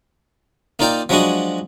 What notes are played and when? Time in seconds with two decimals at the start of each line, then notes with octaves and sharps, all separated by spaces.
0.79 A#3 D#4 F4 D5 F5 G5
1.09 F3 F#3 G#3 D4 F#4 D#5